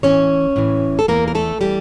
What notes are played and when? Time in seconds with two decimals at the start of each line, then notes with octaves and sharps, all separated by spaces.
0.03 A2 E3 C#4 C#5
0.56 A2 E3
0.99 A4
1.08 E2 E3 A#3 A#4
1.28 A#4
1.35 A3 A4
1.61 E3 G3 G4